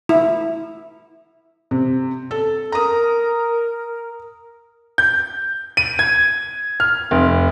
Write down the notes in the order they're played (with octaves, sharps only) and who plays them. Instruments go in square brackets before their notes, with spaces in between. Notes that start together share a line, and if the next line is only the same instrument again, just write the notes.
[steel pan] E4
[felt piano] C3
A4
[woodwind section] A#4 [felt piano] A#5 D#6
[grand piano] G6
D#7
G#6
F6
F1